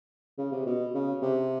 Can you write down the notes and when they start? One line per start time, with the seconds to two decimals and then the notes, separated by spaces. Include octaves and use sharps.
0.38 C#3
0.52 C3
0.66 B2
0.94 C#3
1.22 C3